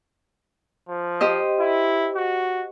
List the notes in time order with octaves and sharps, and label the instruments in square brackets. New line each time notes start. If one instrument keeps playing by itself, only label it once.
[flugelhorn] F3
[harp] G4 C5 D#5
[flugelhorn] E4
F#4